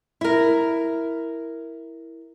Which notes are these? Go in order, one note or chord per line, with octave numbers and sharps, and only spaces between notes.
E4 A#4